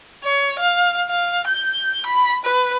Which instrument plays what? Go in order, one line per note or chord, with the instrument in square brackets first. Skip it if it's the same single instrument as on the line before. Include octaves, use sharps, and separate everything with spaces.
[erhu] C#5
F5
F5
G6
B5
B4